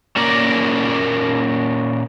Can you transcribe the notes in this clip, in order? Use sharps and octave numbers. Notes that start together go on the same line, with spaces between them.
A#2 A#3 C#4 A#4 D5